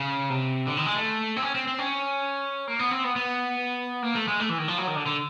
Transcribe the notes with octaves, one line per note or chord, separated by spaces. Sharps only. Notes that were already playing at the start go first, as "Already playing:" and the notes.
Already playing: C#3
C3
D3
D#3
G#3
A3
C4
C#4
C4
C4
C#4
A#3
B3
C4
B3
B3
A#3
A3
G#3
A3
E3
D#3
F3
F#3
D#3
D3
D3